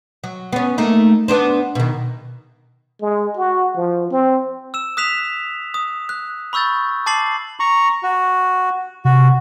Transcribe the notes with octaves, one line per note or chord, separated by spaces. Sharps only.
F#3
B3 C#4
A3 A#3 D#4
B3 D4 C5
B2 D#3
G#3
F#4
F3
C4
E6 E7
D#6 F#6 B6 E7 F7
D#6
F#6
B5 C#6 E6 G6 A6
A5 D6 A6 C7 F#7
A#5 C#6
F#4
C3 F#4